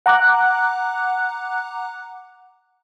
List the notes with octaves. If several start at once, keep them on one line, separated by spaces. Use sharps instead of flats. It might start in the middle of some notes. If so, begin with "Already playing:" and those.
F#5 A#5 D6 F#6